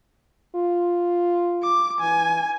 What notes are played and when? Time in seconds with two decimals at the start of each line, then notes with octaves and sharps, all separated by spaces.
0.55 F4
1.63 D6
2.00 E3 G#5